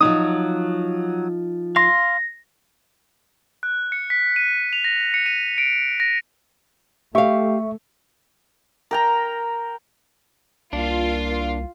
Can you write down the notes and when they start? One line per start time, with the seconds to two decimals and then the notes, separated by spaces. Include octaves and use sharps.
0.01 F3 F#3 D#4 D#6
1.76 F5 C6 A#6
3.63 F#6
3.92 C#7
4.10 B6
4.36 D#7
4.73 F7
4.84 A#6
5.14 C#7
5.26 D#7
5.58 D7
6.00 A#6
7.15 A3 G4 E5 F5 C#6
8.91 A#4 G5 A#5
10.73 C2 A#3 D4 F4